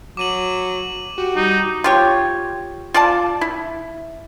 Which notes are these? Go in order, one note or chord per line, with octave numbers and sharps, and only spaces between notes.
F#3 D6 D#7 F#7
F#4 G4
G3 D#4
F4 G4 C#5
F4 D5 A5
E4